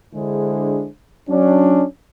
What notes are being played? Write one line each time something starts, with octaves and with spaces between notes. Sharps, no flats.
D3 G#3 D4 E4 G#4 C5
F#3 C#4 D4